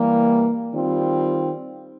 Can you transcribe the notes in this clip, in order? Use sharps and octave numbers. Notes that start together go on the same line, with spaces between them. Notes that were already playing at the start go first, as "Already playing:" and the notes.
Already playing: E3 G3 A#3
D#3 G3 C4 F4